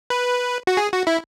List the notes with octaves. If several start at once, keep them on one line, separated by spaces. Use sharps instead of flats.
B4
F#4
G#4
F#4
E4